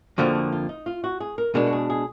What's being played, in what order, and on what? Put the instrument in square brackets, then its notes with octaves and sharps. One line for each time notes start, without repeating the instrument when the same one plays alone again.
[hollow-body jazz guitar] F2 D3 F3 A#3 [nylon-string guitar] F#4
[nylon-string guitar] F#4
F4
D#4
F4
F#4
G#4
A#4
[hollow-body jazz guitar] B2 G#3 D4 [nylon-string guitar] A#4
[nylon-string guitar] F#4
G#4
G#4